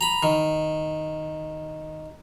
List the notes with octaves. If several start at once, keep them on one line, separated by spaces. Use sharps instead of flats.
A#5 B5
D#3